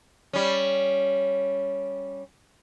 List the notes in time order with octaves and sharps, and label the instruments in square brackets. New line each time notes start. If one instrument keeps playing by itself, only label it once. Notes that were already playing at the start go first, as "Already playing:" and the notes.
[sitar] G3 C#4